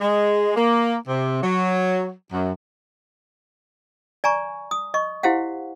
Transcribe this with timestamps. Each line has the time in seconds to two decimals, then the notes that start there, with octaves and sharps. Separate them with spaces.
0.01 G#3
0.57 A#3
1.08 C3
1.43 F#3
2.32 F#2
4.24 D5 G#5 A#5 C#6
4.71 D#6
4.94 D#5 C#6
5.23 E4 G4 C5 F5 F#5